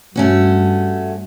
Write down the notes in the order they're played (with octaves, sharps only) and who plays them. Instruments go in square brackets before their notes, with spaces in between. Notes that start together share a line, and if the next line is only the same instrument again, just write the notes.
[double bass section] G2 [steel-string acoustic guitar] A3 C#4 F#4